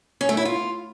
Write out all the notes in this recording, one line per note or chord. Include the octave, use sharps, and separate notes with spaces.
C#4
A3
E4
F4